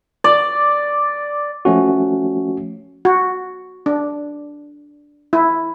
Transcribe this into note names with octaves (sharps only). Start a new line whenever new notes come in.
D5
F3 A3 C#4 F#4
F#4
D4
E4